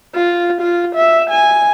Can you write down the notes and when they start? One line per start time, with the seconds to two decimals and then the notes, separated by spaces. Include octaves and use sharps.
0.15 F4
0.61 F4
0.96 E5
1.30 G#5